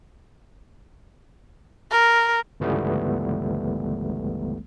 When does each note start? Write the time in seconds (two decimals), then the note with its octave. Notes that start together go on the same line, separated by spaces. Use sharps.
1.91 A#4
2.60 G1 C#2 E3 G3 A3 B3